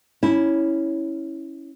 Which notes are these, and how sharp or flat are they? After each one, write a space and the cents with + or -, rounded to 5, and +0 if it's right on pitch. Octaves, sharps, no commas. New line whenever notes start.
C#4 +0 E4 -15